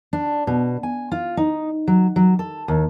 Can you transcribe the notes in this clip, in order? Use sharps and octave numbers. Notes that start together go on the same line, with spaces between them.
D4
B2
G#5
F4
D#4
F#3
F#3
A4
D#2